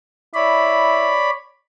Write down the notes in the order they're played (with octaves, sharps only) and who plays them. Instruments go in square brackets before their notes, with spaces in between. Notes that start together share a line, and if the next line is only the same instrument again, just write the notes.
[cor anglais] E4 [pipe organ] C#5 D5 B5